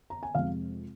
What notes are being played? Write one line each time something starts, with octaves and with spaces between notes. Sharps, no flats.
A#5
G#5
F2 C3 G#3 C4 F5